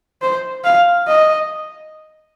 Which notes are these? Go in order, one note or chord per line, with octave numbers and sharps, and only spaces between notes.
C5
F5
D#5